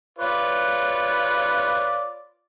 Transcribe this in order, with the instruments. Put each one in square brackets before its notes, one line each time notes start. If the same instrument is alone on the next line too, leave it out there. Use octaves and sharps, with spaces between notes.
[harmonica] F4 C#5 D5 [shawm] B4